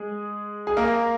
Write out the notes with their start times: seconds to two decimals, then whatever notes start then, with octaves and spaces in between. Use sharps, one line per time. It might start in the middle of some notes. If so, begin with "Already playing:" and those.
Already playing: G#3 G#4
0.67 G#4
0.77 A#3 A#4